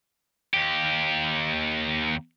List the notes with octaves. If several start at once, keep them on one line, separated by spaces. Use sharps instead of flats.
D#2 G4